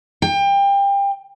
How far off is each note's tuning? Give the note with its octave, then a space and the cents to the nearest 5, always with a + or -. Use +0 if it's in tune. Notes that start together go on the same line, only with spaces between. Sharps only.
G5 +25